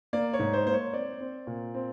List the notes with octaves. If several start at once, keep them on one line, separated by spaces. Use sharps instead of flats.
A#3 D5
C#5
G#2
C5
A#3 C5
C#5
C4 D5
C4
A#2
C4